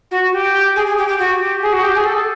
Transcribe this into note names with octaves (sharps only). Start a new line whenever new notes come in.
F#4
G4
G#4
G#4
G4
G4
F#4
G4
G#4
F#4
G4
G#4
A4